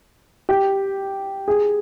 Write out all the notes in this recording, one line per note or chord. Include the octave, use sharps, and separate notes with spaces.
G4
G#4